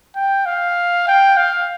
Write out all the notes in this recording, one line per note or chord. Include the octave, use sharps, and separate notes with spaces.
G5
F5
G5
F5